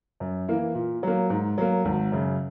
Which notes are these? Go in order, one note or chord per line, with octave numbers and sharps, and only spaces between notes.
F#2
E3 A#3 E4
A#2
F#3 A#3
G#2
F#3 A#3
G#1
F#2 C#3